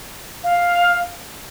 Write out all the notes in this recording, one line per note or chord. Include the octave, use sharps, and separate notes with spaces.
F5